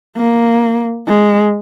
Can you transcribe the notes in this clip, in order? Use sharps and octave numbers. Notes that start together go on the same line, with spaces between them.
A#3
G#3